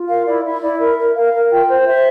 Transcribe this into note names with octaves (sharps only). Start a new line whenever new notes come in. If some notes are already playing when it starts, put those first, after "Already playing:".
Already playing: F4
A#4 F5
E4 D5
E4 E5
E4 D5
A#4 E5
A#4
A#4 F5
A#4
F4 G5
C5
C5 E5